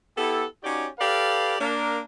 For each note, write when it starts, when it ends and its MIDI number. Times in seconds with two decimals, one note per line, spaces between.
0.17 0.45 59
0.17 0.45 64
0.17 0.45 67
0.17 0.45 69
0.63 0.87 61
0.63 0.87 63
0.63 0.87 66
0.63 0.87 67
0.63 0.87 73
0.63 0.87 74
0.99 1.56 67
0.99 1.56 69
0.99 1.56 71
0.99 1.56 74
0.99 1.56 77
1.60 2.00 58
1.60 2.00 62
1.60 2.00 70